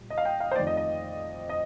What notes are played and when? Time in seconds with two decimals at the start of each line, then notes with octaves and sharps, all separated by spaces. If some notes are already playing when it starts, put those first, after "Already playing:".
Already playing: A#2 G3
0.10 D#5
0.18 F5
0.25 G5
0.40 F5
0.51 C5
0.56 F2 D#3 A3 D5
0.67 D#5
0.77 D#5
1.49 D#5